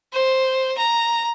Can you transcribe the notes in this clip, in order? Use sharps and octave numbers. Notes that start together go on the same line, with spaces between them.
C5
A#5